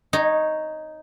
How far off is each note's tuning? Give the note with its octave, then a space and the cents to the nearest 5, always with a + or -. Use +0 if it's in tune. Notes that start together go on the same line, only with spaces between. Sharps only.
D#4 +0 C#5 -10